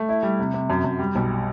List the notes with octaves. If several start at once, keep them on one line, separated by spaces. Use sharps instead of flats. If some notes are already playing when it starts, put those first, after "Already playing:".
Already playing: A3
E4
G3
C3
C3
F#2
F#2
G3
B1